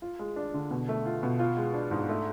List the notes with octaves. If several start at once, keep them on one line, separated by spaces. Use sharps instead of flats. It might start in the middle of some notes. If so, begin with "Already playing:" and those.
F4
G#3
D4
D3
B2
A3
F4
B2
F4
G#3
D4
G#2
A3